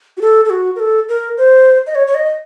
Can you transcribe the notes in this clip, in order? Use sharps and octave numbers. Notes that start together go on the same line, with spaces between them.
F#4
A4
A4
F#4
A#4
A4
A#4
C5
D#5
C#5
C#5
D#5